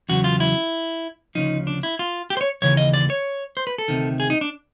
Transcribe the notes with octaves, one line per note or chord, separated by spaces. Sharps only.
E2 C#3 F#3 F#4
F4
E4
D2 C#3 F3 D#4
D4
E4
F4
G4
C5
C#5
D#2 C#3 E3 C#5
D#5
D5
C#5
C5
B4
A4
D2 C3 D#3
G#4
D#4
D4